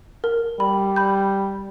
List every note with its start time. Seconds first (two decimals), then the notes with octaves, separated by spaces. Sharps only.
0.24 A#4
0.60 G3 B5
0.96 B5 G6